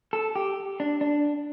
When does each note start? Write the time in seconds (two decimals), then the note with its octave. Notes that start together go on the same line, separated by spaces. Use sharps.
0.13 A4
0.36 G4
0.80 D4
1.01 D4